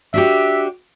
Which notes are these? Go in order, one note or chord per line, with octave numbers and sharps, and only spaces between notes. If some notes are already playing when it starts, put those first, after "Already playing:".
D4 F#4 G4 E5